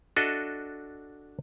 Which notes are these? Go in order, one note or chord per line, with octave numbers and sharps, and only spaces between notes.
D4 F#4 A4 D#5 E5